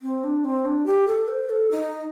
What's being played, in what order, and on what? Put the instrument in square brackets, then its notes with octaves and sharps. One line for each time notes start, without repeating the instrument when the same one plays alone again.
[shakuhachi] C4
D4
C4
D4
G4
A4
C5
A4
D#4